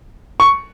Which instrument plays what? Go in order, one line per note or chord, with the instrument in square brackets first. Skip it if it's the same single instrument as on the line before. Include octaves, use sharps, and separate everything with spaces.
[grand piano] C#6